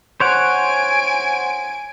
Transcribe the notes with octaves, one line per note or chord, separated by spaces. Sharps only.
C5 C#5 F#5 G#5 D7